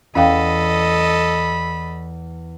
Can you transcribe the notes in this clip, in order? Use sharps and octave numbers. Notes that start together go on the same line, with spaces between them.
E2 C#4 A4 D#5 F5 G5 B5